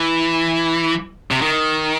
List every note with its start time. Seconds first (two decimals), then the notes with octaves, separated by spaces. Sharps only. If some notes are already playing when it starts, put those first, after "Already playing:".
Already playing: E3
1.31 C3
1.41 D#3